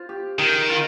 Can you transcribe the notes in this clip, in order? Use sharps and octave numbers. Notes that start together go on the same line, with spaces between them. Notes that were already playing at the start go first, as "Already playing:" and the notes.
Already playing: F4 C5
G4
D#3 G#4
F4